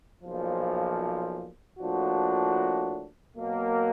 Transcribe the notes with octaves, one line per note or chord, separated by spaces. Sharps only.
B1 A#2 F3
A2 F3 A#3 D4 F#4
B2 F#3 A#3